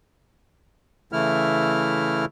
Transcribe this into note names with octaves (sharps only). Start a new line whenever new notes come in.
C#3 E3 A3 E4 F6